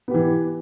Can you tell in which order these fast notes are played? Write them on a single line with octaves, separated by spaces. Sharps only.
B3 G4 E3